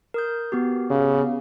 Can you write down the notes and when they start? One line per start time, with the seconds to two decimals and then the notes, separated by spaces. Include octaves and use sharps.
0.14 A#4 D#6 G6
0.52 B3 F#4 G4
0.90 C#3